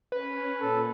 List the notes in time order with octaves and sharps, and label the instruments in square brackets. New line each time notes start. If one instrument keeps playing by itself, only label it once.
[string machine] C#4 [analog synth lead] B4
[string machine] A#2 [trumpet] A4